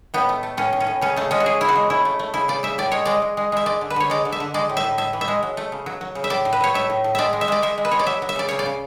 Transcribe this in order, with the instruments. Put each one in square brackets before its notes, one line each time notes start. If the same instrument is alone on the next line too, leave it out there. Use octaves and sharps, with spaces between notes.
[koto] A2 B3
A3
A3
A2 C#4
A2
C#4
A2
C#3 C#4
C#3 A3
G#3 C#4
F#4
G#3 G#4
C#3 E4
F#4
G#3
C#3 E4
A3
A3
C#3 E4
C#3 D5
C#3 E5
A2 D5
G#3 C#5
G#3 D5
G#3
G#3
G#3 E5
G#3 D5
D3
B4
D3 C#5
G#3 D5
D3
E5
D3
G#3 D5
A2
E5
A2
A2 E5
E3
E5
G#3
F#3
A3
C#3
F#3
F#3
C#3
E5
A2 D5
A2
B4
F#3 C#5
A3 E5
A2
A2
G#3 D5 E5
G#3
E5
G#3 D5
G#3 E5
G#3
B4
G#3 C#5
D5
F#3 E5
F#3
E5
C#3 D5
C#3 C#5
D5
C#3